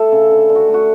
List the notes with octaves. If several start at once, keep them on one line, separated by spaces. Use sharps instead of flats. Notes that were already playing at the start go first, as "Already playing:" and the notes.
Already playing: A3 A4 E5
C#3
D3
D3
F#4
A3
F#4